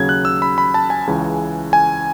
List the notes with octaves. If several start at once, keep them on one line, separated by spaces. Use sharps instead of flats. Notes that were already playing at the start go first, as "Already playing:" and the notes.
Already playing: D#2 C#3 F#3 G#6
F#6
E6
B5
B5
A5
G#5
C#2 C#3 E3
G#5